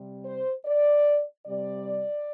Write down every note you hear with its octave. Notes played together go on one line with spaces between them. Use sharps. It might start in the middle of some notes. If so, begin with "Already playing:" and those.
Already playing: C3 G3
C5
D5
C3 G3 D5